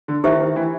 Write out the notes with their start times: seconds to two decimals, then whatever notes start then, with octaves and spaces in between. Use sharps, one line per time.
0.08 D3
0.24 D#3 E4 G4 C5 E5
0.40 D#3
0.56 E3